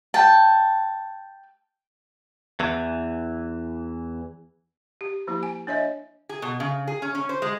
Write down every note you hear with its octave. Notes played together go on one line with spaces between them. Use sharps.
G5 A5
E2 E3
G4
F3 A#3 E4 G4
G#5
D4 C#5 D#5 E5
G#4
B2
C#3
G#4
C#4
C#4
C5
G#3